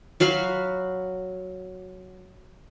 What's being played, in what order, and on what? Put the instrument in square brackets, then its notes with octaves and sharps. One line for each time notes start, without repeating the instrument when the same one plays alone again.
[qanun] F#3 F#4 F5 B5